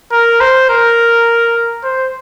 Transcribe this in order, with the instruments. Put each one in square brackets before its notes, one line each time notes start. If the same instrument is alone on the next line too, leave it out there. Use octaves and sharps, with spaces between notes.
[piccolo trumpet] A#4
C5
A#4
C5